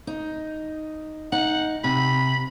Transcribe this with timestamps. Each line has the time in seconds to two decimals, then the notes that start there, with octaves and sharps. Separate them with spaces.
0.07 D#4
1.32 D#4 F#5
1.84 C3 B5